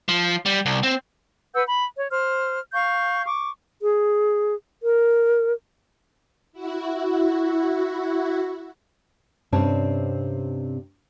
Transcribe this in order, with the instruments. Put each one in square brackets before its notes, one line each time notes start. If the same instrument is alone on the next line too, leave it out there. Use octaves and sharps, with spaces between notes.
[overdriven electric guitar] F3
G3
C2
C4
[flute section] B4 F#5 E6 G6
B5
C#5
C5 F6
F5 C#6 G6
C#6 D6
[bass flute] G#4
A#4
[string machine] E4 F#4
[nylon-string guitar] G2 C3 C4 C#4 C#5 A5